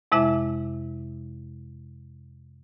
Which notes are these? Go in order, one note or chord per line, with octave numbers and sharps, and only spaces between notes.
F2 C3 G#3 E4 E5 D6